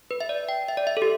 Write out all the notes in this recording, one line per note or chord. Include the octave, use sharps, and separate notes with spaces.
B4
E5
D5
G5
E5
D5
E5
A4
G4